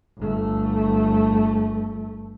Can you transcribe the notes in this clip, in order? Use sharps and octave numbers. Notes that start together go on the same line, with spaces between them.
G1 A3